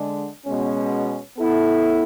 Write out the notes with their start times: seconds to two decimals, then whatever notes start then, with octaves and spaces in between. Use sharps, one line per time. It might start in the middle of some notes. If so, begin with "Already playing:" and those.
Already playing: D3 G#3 D4
0.46 B2 G#3 C#4
1.37 B3 E4 A4